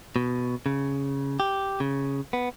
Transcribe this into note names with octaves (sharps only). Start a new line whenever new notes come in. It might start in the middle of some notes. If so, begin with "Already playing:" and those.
B2
C#3
G4
C#3
B3